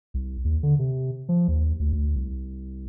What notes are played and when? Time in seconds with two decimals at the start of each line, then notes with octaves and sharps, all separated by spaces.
0.14 C2
0.45 D#2
0.63 D3
0.79 C3
1.29 F3
1.48 D#2
1.79 D2
1.92 D2
2.16 C2